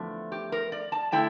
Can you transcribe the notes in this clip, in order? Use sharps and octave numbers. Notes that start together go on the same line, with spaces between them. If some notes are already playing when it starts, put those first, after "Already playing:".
Already playing: E2 D3 F3 A3
G4
A#4
D5
A5
D3 A3 E4 G5